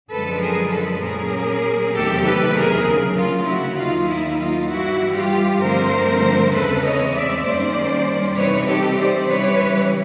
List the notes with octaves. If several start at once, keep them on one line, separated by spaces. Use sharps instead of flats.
F#2 D3 F3 G#3 A4 B4
G#4 A#4
A4 B4
A#2 F#3 A#3 C#4 G#4 A#4
E2 C3 D#3 F#3 A3 G4 A4
A4 B4
G#4 A#4
D2 C#3 F#3
F4
E4 F#4
D#2 D#3 F#3 A#3 D#4 F4
E4
F4
G2 E3 G3 E4 F#4
F4 G4
G2 D3 F3 A3 C4 A#4 C5
E2 C#3 E3 G#3 C4 A4 B4
C#5 D#5
D5 E5
F#2 D#3 G3 A#3 C#4 C5 D5
C3 E3 G3 C4 D#4 B4 C#5
G4 A4
C5 D5
C#3 E3 G3 B4 C#5